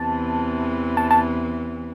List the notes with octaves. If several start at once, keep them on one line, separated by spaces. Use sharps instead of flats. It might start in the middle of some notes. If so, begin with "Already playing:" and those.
Already playing: E2 C3 E3 A5
A5
A5